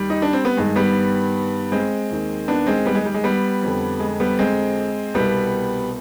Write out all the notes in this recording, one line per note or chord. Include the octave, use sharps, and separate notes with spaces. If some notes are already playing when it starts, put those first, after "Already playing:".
Already playing: D#2 D#3 G3
D#4
D4
C4
B3
G2 D#3 G#3
G3 B3
G#3 C4
D#2 D#3
B3 D4
G#3 C4
G3 B3
G#3
G3
G#3
G3 B3
F2 D3
G#3
G3 B3
G#3 C4
C2 B2 G3 B3